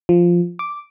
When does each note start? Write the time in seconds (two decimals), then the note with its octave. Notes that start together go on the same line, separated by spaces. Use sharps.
0.09 F3
0.59 D6